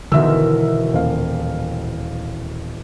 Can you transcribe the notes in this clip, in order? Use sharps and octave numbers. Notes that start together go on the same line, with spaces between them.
E1 B2 D3 D#3 A#4 E5 E6
D#1 F5